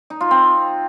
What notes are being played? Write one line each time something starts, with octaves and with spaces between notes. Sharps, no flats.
D#4
F4
C4